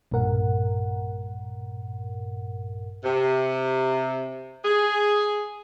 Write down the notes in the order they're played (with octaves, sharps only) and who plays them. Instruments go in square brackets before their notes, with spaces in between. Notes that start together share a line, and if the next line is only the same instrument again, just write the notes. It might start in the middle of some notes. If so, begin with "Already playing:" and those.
[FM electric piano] B1 G2 A#2 A#4 F#5
[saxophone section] C3
G#4